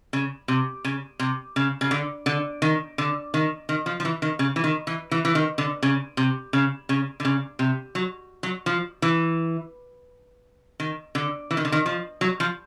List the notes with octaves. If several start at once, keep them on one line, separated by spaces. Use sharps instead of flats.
C#3
C3
C#3
C3
C#3
C#3
D3
D3
D#3
D3
D#3
D#3
F3
F3
E3
D#3
C#3
E3
D#3
E3
E3
E3
D#3
D3
C#3
C3
C#3
C#3
D3
C#3
C3
F#3
F#3
F3
E3
D#3
D3
E3
D#3
D3
D#3
F3
F#3
F3